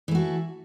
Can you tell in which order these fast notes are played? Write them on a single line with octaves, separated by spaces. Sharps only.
E3 A3 F#4